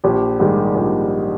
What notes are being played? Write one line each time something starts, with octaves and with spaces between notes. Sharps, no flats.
A#1 G4
G#2 D#3 G3 G4
A#1